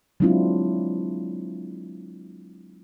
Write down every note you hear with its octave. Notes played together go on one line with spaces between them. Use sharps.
F#3 G#3 C4 D4 E4 F4